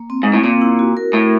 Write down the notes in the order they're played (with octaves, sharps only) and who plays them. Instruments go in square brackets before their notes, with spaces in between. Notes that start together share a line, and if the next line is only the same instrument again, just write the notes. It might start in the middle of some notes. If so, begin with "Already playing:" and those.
Already playing: [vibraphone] A#3
C4
[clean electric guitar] G#2 [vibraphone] C4
[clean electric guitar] A2
[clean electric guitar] A#2 [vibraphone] C4
[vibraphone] E4
F#4
A#4
[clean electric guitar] A2 [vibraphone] A3